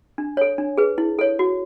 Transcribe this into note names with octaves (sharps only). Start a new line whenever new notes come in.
D4
A4 C#5
D4
G#4 B4
E4
A4 C#5
F#4